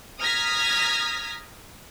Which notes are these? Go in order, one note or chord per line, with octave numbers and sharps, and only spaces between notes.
A#5 D#6 F6 G#6 A#6 B6